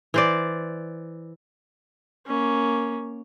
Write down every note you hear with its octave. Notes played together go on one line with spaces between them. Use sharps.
E3 C5 D5
A#3 C#4